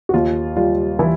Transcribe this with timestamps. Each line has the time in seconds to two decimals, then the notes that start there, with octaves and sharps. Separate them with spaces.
0.09 F#4
0.14 D#2 F4
0.56 G3 F4
0.99 E3 E4